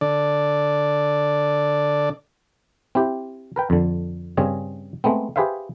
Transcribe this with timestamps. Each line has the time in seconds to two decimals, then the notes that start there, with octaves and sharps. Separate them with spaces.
0.01 D3 D5
2.95 C4 E4 G4
3.56 A#4 B4 G5
3.70 F2 D3
4.37 G2 C#3 C4 C#4 G#4 D#5
5.04 G#3 A3 B3 C4
5.36 G4 G#4 B4 C5 E5 F5